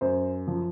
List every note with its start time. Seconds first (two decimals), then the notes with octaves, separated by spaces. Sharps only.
0.01 F#2 C5
0.48 F3